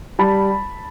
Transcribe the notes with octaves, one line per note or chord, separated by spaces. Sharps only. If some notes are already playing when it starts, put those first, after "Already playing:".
G3 A5 B5